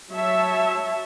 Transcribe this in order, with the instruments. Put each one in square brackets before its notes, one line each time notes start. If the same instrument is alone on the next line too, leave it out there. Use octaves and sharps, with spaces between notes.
[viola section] F#3 C#5 E5 A5